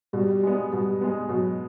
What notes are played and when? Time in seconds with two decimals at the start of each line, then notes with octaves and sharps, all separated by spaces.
0.13 B2 G3
0.43 G#3 B3
0.72 B2 G3
1.01 G#3 B3
1.29 B2 F#3